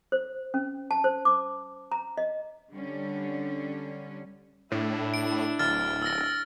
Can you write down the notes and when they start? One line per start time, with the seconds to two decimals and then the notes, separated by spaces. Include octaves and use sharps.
0.12 C5
0.54 C#4
0.91 A5
1.04 C5
1.25 D6
1.92 A#5
2.18 D#5
2.72 D3 G3 C#4
4.72 A2 D4 E4
5.14 D7
5.59 D1 F6 A6
6.02 E6 A#6